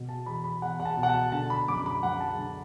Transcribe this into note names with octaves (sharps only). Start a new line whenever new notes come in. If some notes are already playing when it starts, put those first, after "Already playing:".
Already playing: B2
A5
E2 B5
B5
E2 F#5
F#5
A5
B2
F#5
A5
D3 A5
B5
F#2 D6
B5
F#2 F#5
A5
D3